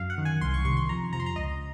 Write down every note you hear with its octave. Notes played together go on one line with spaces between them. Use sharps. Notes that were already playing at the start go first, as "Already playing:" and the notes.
Already playing: F#2 F5
F#5
D#3
G#5
C2 C6
C#6
C3 D#3 C#6
C6
F2 A#5
C3 F3 A#5
C6
A#5
C#2 D#5